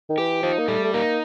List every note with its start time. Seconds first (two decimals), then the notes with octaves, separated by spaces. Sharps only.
0.10 D#3
0.18 E3 G4
0.43 F3 D#4
0.59 A#3
0.68 G3 A3
0.84 A3
0.94 A#3 D#4